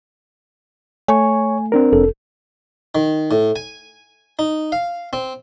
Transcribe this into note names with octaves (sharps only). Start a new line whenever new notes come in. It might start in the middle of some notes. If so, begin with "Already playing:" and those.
A3 C#5 G#5 C#6
C4 D4 A#4
F1 A4
D#3
A2
G#5
D#4
F5
C4